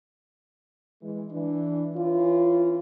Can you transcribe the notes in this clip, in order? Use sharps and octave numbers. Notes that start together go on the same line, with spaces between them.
E3 G#3
E3 D4
E3 C#4 F4